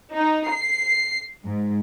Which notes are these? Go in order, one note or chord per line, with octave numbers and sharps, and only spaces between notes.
D#4
C7
G#2